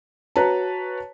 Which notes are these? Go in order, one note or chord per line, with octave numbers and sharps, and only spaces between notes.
F#4 B4 C#5 A5 A#5